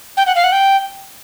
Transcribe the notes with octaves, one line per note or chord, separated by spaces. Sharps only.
G5
F#5
F5
F#5
G5